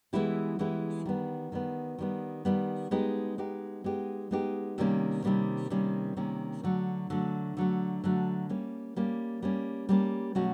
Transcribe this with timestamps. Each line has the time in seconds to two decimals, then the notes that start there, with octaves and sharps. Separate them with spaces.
0.13 E3 G#3 B3 E4 G4
0.59 E3 G#3 B3 E4 G4
1.06 D#3 G3 B3
1.52 D#3 G3 B3
1.98 D#3 G3 B3
2.45 D#3 G3 B3
2.91 G#3 B3 D#4 G4
3.38 G#3 B3 D#4 G4
3.84 G#3 B3 D#4 G4
4.31 G#3 B3 D#4 G4
4.78 C3 D#3 G3 A#3 C#4
5.24 C3 D#3 G3 A#3 C#4
5.70 C3 D#3 G3 A#3 C#4
6.17 C3 D#3 G3 A#3 C#4
6.64 D3 F#3 A3
7.10 D3 F#3 A3
7.57 D3 F#3 A3
8.04 D3 F#3 A3
8.49 G3 A#3 C#4
8.96 G3 A#3 C#4
9.42 G3 A#3 C#4
9.89 G3 A#3 C#4
10.35 B2 F#3 A3 C#4 F#4